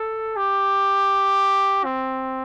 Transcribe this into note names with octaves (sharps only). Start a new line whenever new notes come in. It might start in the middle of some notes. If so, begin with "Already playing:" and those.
Already playing: A4
G4
C4